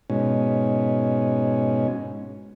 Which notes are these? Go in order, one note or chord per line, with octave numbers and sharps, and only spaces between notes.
G#2 B2 C#4